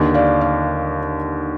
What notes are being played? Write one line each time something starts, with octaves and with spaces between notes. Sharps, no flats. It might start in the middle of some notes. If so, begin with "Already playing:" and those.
Already playing: D#2 D3
D5 F5
D5 F5